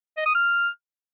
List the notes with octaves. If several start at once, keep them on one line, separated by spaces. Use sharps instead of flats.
D#5
D#6
F6